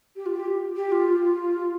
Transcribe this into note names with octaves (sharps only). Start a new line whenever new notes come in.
G4
F4
G4
G4
F4